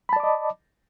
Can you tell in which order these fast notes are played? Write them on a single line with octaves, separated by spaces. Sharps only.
B5 A5 D5 D6 D#5